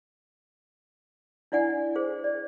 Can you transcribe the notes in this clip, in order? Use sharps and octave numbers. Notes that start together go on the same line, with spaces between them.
D4 E4 D5 F#5 G#5
G#4 C5
D5